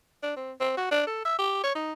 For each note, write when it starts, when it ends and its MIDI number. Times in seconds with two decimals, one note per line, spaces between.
0.23 0.34 62
0.36 0.52 60
0.61 0.74 60
0.77 0.91 66
0.91 1.02 62
1.07 1.23 69
1.25 1.38 76
1.39 1.59 67
1.64 1.73 73
1.75 1.92 63